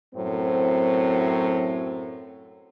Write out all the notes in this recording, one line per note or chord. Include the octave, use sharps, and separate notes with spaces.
F#2 A2 F#3 C4